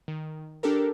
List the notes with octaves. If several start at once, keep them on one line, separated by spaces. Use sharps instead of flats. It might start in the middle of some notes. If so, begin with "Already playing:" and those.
D#3
D4 G4 A4 A#4